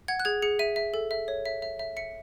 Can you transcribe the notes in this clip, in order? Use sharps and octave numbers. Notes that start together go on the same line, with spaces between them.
F#5 G#6
F#6
G#4 G#6
G#4 C#7
E5 D#7
E5
A4
E5
C#5
E5
E5
E5
E5 C#7